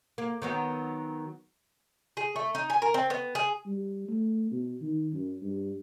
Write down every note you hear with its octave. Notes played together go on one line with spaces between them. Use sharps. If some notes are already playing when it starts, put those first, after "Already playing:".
A#3
D#3 F#3 B3
G#4
A3
D#4
G#5
A#4
C4
B3
G#4
G3
A3
B2
D#3
F#2
G2